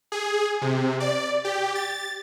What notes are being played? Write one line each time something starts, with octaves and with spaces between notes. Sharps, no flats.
G#4
C3
D5
G4
A6